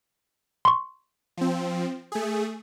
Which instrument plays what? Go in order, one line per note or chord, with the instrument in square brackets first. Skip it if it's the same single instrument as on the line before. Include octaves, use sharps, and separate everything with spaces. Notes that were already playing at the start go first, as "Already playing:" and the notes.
[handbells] C6 C#6
[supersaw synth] F3 C4
A3 G#4